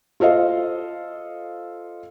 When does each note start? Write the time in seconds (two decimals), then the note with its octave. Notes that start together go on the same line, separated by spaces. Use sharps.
0.20 F4 A4 C5 D#5 F5